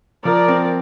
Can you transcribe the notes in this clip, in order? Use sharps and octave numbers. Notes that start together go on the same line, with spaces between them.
F3 A#4 D5
C4